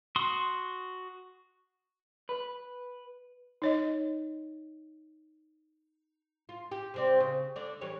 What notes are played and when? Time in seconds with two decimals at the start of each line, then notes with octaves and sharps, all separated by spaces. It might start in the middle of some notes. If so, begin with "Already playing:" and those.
0.16 F#4 C6 D#6
2.29 B4
3.62 D#4 C#5 D#5
6.49 F4
6.71 G4
6.94 C3 C4 D5
7.20 C#3
7.56 D3 D5
7.81 E3 G3 C#5